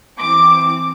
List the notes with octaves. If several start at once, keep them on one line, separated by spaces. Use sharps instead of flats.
E3 C4 D6